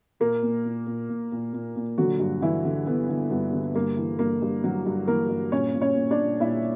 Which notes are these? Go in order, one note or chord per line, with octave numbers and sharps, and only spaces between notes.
A#2 A#3 A#4
A#2
A#2
A#2
A#2
A#2
A#2
A#2
D3 F#3 F#4
G2
D3 E3 E4
D3
D3 B3
D3
G2 B3
D3
G2 A#3
E3
G2 A#3
G2
G2 F#3 F#4
G2
E3 A#3 A#4
G2
A#2 C#4 C#5
A#2
C#4 C#5
A#2
D4 D5
A#2
A#2 E4 E5